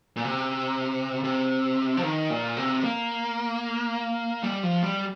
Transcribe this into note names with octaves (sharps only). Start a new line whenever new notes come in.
A#2
C3
C3
F3
D#3
A#2
C3
A#3
G3
F3
G3